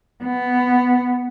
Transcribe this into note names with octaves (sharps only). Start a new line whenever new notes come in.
B3